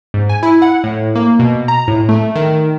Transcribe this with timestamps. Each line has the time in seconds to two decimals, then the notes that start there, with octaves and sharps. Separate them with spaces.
0.14 G#2
0.29 G#5
0.43 E4
0.62 F#5
0.84 A2
1.16 A#3
1.39 B2
1.68 A#5
1.88 A2
2.09 A3
2.35 D#3